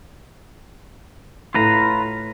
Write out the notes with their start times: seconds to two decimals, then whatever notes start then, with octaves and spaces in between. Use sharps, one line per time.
1.54 A2 F4 B4 A#5